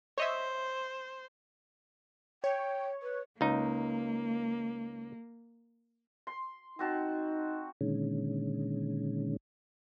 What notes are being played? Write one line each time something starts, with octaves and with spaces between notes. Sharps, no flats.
C5 C#5 D#5 E5
C#5 G5
B4
C#2 A#3 D#4
C6
C4 D#4 F#4 A5
A#2 D3 D#3 G#3 C#4